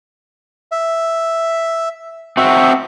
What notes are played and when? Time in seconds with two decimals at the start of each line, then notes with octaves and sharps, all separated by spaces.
0.72 E5
2.37 C4 F#4 E5